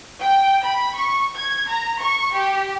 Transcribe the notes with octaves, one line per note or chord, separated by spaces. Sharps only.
G5
B5
C#6
G#6
A#5
C#6
G4